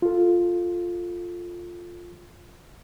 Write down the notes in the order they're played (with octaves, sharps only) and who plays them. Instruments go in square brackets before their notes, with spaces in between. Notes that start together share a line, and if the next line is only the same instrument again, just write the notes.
[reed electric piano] F4 A4